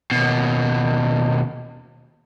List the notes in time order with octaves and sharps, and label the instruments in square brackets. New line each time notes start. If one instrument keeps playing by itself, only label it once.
[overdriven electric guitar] D#2 B2